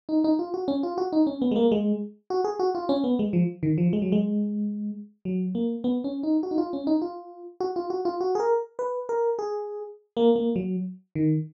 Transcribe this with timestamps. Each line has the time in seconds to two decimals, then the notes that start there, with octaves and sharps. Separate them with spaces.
0.09 D#4
0.24 D#4
0.39 F4
0.54 F#4
0.68 C#4
0.83 F4
0.98 F#4
1.12 D#4
1.27 C#4
1.42 B3
1.51 G#3
1.56 A#3
1.72 G#3
2.30 F#4
2.44 G#4
2.59 F#4
2.75 F4
2.89 C#4
3.04 B3
3.19 G#3
3.33 F3
3.63 D#3
3.78 F3
3.93 G#3
4.02 F#3
4.12 G#3
5.25 F#3
5.55 A#3
5.84 B3
6.04 C#4
6.23 D#4
6.43 F#4
6.51 D#4
6.58 F4
6.73 C#4
6.87 D#4
7.02 F4
7.60 F#4
7.76 F4
7.90 F#4
8.05 F4
8.21 F#4
8.35 G#4
8.40 A#4
8.79 B4
9.09 A#4
9.39 G#4
10.17 A#3
10.36 A#3
10.56 F#3
11.15 D#3